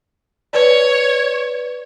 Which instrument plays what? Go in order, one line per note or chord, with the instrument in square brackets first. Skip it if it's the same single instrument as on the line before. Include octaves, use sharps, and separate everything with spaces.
[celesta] B4 D5 [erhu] C#5